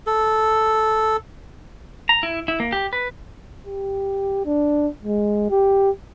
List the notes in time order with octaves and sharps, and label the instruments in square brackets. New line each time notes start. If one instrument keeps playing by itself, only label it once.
[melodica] A4
[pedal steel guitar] A#5
E4
E4
A#3
G4
B4
[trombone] G4
D4
G#3
G4